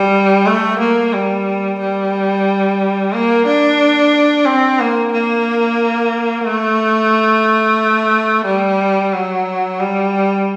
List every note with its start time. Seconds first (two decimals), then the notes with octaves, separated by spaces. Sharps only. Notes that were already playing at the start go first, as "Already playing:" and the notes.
Already playing: G3
0.46 A3
0.79 A#3
1.13 G3
1.80 G3
3.14 A#3
3.47 D4
4.46 C4
4.80 A#3
5.13 A#3
6.46 A3
8.46 G3
9.13 F#3
9.80 G3